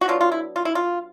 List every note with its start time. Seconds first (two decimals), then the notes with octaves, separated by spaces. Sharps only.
0.01 F#4
0.08 F#3 B3 D4 F4
0.21 F4
0.32 E4
0.56 F4
0.65 E4
0.75 F4